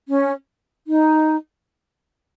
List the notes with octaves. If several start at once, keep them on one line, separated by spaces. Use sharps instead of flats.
C#4
D#4